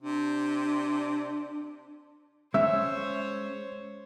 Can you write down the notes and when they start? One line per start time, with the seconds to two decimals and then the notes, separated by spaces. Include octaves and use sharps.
0.02 C3 D4
2.54 G#3 C#4 C5 C#5 E5